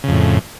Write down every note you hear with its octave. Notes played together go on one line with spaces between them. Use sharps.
F2 A2 C#3